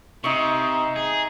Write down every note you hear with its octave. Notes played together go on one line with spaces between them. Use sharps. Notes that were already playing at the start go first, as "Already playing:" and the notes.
C3 D#4 E5 C#6
G#4